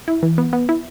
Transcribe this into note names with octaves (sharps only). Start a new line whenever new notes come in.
E4
E3
B3
B3
E4